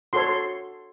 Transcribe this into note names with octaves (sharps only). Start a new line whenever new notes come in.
F#4 A4 C#5 C6
C6